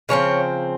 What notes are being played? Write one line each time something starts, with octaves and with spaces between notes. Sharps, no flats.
C#3 F3 C4 C#5